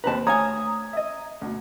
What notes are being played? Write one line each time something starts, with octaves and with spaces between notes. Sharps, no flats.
D#2 C4 B4 A5 A#5
D2 C#5 F5 G#5 A#5 D#6 G#6
D#5 E5
D2 B2